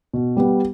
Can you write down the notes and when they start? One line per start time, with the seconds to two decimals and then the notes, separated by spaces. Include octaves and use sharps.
0.13 B2
0.37 G3 B3